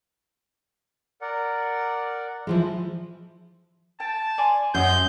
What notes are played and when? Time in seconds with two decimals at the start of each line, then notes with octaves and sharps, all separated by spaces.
1.21 A#4 D5 F#5
2.47 E3 F3 G#3
4.00 G5 A5
4.38 D5 G#5 C6
4.74 F#2 D#5 C6 G6